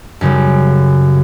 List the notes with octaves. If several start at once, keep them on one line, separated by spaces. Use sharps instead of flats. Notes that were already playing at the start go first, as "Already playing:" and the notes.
F#2 C#3 G3